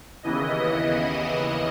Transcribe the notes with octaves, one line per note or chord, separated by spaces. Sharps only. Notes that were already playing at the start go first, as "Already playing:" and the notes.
D#2 C#3 E3 B3 E4 D#5